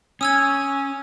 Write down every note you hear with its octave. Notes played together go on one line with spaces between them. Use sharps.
C#4 G#5 D#6 E6 G#6